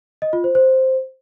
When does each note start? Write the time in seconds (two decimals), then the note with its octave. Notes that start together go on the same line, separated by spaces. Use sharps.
0.22 D#5
0.33 F4
0.44 C5
0.55 C5